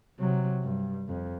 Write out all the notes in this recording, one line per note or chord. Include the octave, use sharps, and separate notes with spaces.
C3 F#3
G2
F2